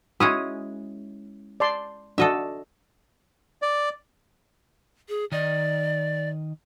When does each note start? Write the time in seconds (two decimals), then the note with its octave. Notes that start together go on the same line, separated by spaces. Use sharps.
0.20 G#3 C#4 E4 F#4 D#6
1.60 D5 A5 C6
2.18 D4 F#4 A4 D#5 E5
3.62 D5
5.09 G#4
5.32 D#3 D5 D#5